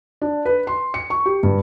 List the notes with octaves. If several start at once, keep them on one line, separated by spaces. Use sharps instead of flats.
D4
B4
C6
C#7
C#6
G4
G2